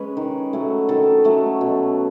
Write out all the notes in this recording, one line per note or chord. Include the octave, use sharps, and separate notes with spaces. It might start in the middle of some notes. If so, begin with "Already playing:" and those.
Already playing: G#3 C#4 B4
D#3
F#3 A3 C#4
D#3 A4
F#3 A3 C#4
B2